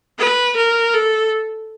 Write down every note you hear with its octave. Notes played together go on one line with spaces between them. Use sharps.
B4
A#4
A4